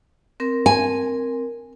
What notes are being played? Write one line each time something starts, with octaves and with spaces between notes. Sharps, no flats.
C4 A#4
G#5